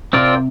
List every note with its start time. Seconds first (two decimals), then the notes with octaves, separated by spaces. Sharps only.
0.13 C3 C4 F4 A#4 D5